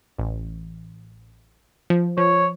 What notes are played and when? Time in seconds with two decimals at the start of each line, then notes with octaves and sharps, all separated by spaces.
0.18 A1
1.90 F3
2.17 F3 C#5